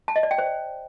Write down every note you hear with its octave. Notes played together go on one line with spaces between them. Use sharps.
A5
D#5
D5
G5
C5